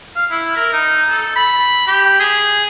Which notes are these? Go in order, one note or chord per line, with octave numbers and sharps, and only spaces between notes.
F5
E4
A#4
D#4
A4
B5
G4
G#4